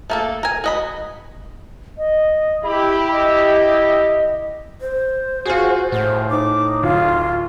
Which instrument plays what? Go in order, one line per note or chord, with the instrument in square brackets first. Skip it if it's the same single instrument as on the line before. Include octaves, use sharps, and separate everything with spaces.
[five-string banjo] A3 A#3 A4
A#4 G#5
F#4 D#5 B5
[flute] D#5
[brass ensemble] E4 G4 [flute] B5
[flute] D#5
[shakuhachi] C5
[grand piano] F4 G#4 [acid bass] F#4
[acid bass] A2 [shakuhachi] C5
[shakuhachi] D#4 [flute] D6
[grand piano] D1 [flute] F4